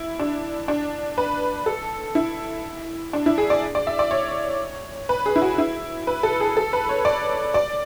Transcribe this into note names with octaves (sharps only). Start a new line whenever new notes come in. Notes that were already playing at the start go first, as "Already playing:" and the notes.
Already playing: E4
D4
D4
B4
A4
E4
D4
E4
G#4
D5
D5
E5
D5
C#5
B4
G#4
E4
F#4
E4
B4
A4
G#4
A4
B4
C#5
D5
D5